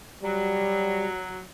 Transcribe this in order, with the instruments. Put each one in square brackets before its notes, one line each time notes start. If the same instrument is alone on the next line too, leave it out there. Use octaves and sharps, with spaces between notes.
[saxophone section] F#3 [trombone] G3